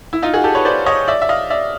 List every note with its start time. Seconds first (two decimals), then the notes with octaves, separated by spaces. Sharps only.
0.13 E4
0.22 D#4 F4
0.34 F#4 G#4
0.44 G4 A4
0.55 B4 C#5
0.65 C5 D5
0.86 C#5 D#5
1.08 D5 E5
1.22 E5
1.29 D#5 F5
1.50 D5 E5